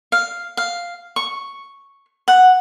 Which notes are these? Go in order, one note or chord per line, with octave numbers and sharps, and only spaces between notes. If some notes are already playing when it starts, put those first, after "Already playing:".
F5
F5
C#6
F#5